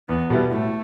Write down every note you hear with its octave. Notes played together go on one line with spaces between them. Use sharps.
E2 B3
B2 G3 B3 E4
A2 A3